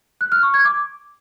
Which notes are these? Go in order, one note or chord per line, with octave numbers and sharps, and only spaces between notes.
F#6
F6
C#6
G#6
D6